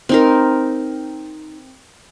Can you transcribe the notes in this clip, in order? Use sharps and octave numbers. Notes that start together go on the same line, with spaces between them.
C4 D#4 A#4